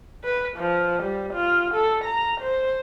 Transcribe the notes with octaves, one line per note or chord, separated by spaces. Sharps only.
B4
F3
G3
F4
A4
A#5
C5